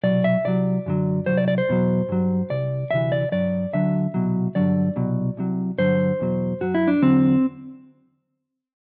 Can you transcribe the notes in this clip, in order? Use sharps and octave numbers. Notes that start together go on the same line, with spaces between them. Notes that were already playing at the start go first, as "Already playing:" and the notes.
C2 B2 F#3 D5
E5
C2 C3 F#3 D5
F#2 D3 F#3
C2 C3 F#3 C5
D5
D5
C5
E2 B2 F#3
G2 F#3
C2 C3 D5
D2 C3 E3 E5
D5
G2 F#3 D5
D2 D3 F#3 E5
C2 B2 F#3
G2 D3 F#3 D5
C2 B2 F#3
C2 C3 F#3
G2 D3 F#3 C5
E2 B2 F#3
F#2 F#3 F#4
E4
D4
E2 D3 F#3 C4